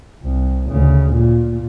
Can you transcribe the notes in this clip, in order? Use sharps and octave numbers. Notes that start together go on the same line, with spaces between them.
C2
D2 C#3
A#2